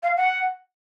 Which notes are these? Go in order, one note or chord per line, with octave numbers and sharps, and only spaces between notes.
F5
F#5